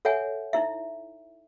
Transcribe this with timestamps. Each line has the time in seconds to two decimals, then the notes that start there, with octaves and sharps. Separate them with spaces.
0.05 A4 C#5 E5 F#5 G#5
0.53 D#4 E4 E5